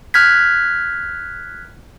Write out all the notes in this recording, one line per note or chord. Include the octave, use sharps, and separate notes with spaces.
F6 F#6 G#6 B6